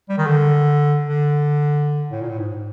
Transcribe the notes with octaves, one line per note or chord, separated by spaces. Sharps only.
G3
D#3
D3
D3
A2
A#2
A2
G#2